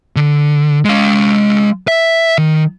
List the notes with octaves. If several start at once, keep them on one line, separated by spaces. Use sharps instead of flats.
D3
G#3 F5
E5
D#3